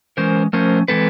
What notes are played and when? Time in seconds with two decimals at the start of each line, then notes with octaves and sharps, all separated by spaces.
0.17 E3 G#3 C#4 A#4 C5
0.53 F3 A3 C#4 A#4 C5
0.88 E3 G#3 C4 A4 B4